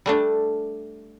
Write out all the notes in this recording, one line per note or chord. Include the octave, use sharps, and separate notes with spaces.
G3 A3 D4